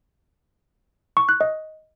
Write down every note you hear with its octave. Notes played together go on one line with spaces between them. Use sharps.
C#6
F#6
D#5